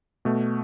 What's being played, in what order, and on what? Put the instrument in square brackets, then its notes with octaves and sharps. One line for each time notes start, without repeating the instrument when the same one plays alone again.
[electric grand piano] B2 A3